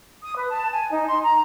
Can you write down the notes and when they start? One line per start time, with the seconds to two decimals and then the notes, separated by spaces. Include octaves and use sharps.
0.22 D#6
0.35 B4
0.51 A5
0.72 G#5
0.91 D#4
1.07 C6
1.23 A#5